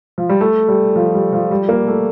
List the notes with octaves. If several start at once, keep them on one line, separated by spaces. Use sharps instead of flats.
F3
G3
A3
G3
F3
G3
F3
G3
A#3
A3